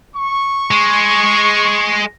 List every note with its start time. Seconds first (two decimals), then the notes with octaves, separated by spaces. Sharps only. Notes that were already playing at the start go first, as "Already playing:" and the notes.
0.16 C#6
0.71 G#3